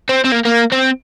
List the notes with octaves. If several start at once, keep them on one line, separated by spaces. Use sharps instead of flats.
C4
C4
A#3
A#3
C4